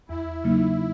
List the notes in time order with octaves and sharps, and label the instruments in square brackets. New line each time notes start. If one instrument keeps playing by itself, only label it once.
[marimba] E2 [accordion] E4
[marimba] C#3 F#3 A#3 D#4